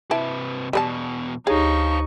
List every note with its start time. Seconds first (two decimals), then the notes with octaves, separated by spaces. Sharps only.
0.11 C3 E4 B4 A5
0.73 E2 B2 G3 B4 A5
1.47 D2 D#4 G4 G#4 C5 C#5 F5 C#6